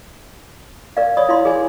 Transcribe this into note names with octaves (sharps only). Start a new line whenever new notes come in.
A#4 D5 F5
C#5 D5 B5 D#6
E4 F5 C6
G#4 A#4 D5 G#5